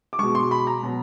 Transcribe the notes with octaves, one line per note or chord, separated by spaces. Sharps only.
D6
B2 G#3 C#6
C6
B5
A#5
B2 F#3